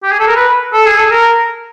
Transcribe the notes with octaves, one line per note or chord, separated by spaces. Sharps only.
G4
G#4
A4
A#4
B4
A4
G#4
A4
A#4